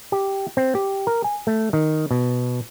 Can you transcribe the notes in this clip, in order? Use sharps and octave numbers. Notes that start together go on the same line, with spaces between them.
G4
C4
G4
A#4
G#5
A3
D#3
B2